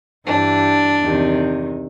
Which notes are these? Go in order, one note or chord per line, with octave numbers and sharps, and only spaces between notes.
G2 E3 G3 D4
E2 C3 D#3